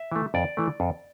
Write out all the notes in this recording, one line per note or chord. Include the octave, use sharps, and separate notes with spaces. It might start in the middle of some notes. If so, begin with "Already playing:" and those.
Already playing: E5
E3 A3
F2 D5
E3 A3
F2